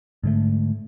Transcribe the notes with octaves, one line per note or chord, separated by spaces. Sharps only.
G#2 D3 A3